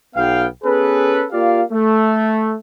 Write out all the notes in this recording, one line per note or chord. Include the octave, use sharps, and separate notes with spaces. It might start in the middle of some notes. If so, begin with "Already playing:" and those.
B1 B3 F5 G5
B3 C#4 G#4 A4 B4
A#3 F4 G4 D5 F5
A3